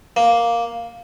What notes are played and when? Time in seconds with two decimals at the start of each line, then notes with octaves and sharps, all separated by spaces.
0.16 A#3